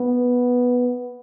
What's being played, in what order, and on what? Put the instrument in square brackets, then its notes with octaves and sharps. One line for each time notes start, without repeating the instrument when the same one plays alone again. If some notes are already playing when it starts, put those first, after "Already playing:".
Already playing: [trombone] B3